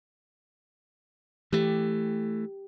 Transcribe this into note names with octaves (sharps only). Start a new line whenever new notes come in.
E3 A3 G4